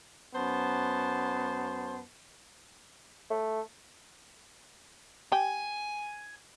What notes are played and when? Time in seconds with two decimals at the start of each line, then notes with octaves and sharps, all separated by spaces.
0.34 F#2 B3 C5 A5
3.30 A3
5.32 G4 G#5